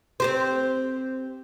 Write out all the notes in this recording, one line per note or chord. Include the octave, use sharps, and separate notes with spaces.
C4 G4 C5